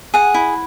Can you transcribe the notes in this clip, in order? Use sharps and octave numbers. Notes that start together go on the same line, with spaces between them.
G#4 F#5
E4